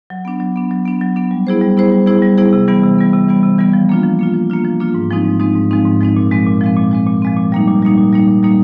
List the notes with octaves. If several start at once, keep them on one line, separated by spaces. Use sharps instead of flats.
F#3
B3 D4
F#3
B3 D4
F#3
B3 D4
F#3
B3 D4
G3
B3 E4 G#4 C5
G3
B3 E4 G#4 C5
G3
B3 E4 G#4 C5
G3
B3 E4 G#4 C5
C3
E3 G3 B3
C3
E3 G3 B3
C3
E3 G3 B3
C3
E3 G3 B3
F3
A#3 D4 F4
F3
A#3 D4 F4
F3
A#3 D4 F4
F3
A#3 D4 F4
G#2
F3 G#3 C4 D#4
G#2
F3 G#3 C4 D#4
G#2
F3 G#3 C4 D#4
G#2
F3 G#3 C4 D#4
A#2
F3 G#3 C4
A#2
F3 G#3 C4
A#2
F3 G#3 C4
A#2
F3 G#3 C4
A#2
G3 A#3 D#4
A#2
G3 A#3 D#4
A#2
G3 A#3 D#4
A#2
G3 A#3 D#4